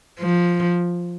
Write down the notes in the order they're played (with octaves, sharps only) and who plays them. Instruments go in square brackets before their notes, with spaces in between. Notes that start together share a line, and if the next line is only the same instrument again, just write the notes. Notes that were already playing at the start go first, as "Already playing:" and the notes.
[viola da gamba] F3